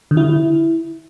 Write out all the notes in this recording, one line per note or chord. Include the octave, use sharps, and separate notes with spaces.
D3
E4
D3
E4